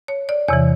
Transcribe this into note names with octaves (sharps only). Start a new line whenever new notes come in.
C#5
D5
E2 C3 E3 C#5